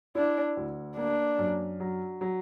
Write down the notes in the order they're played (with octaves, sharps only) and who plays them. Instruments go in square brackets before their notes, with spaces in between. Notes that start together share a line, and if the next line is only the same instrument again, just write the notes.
[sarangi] D4 [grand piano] E4
[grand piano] D2
[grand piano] A#3 [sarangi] D4
[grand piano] F#2
F#3
F#3